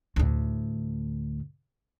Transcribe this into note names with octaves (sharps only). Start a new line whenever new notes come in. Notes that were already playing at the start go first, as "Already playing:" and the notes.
D2 A2